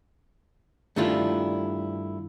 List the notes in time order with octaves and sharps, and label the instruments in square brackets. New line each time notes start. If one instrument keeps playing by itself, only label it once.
[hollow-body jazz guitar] G2 D#3 A3 D4 E4 F4